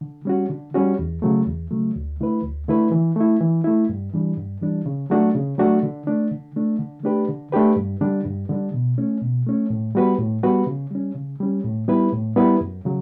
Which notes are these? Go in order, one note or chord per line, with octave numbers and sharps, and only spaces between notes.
D3
G3 C#4 F#4
D3
G3 C#4 F#4
E2
C#3 F#3 A3
E2
C#3 F#3 A3
D2
D3 A3 E4 B4
D2
D3 A3 E4 B4
E3
A3 E4
E3
A3 E4
G2
E3 G3 D4
G2
E3 G3 D4
C#3
F#3 A3 D4 F#4
C#3
F#3 A3 D4 F#4
D3
A3 D4
D3
A3 D4
D3
A3 D4 G4 B4
D3
A3 D4 G4 B4
G2
D3 G3 D4
G2
D3 G3 D4
B2
A3 C#4
B2
A3 C#4
A2
G3 B3 F#4 B4
A2
G3 B3 F#4 B4
C#3
G3 C#4
C#3
G3 C#4
A2
G3 B3 E4 B4
A2
G3 B3 E4 B4
F#2
C#3 F#3